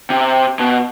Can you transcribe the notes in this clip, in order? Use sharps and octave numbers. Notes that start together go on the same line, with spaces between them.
C3
B2